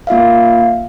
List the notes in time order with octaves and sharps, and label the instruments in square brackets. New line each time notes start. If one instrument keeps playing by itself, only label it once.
[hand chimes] A#3 F4 E5 F5